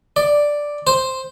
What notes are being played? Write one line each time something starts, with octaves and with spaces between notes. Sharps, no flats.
D5
C5